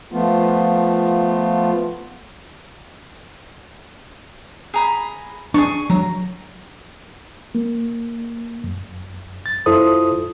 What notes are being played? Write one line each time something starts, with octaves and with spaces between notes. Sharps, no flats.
F3 A3 B3 F4
G#4 A#5 B5
D4 G#4 C#6
F#3 A#5
A#3
F#2
A6
F#2 E4 F4 A4 C5 D#6